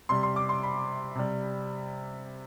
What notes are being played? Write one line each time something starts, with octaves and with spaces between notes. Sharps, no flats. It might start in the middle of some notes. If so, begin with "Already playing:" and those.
C3 G3 C6
C6
D6
C6
B5
C3 G3